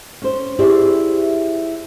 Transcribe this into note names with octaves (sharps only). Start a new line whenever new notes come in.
C#4 C5
E4 G4 G#4 C5 D5 E5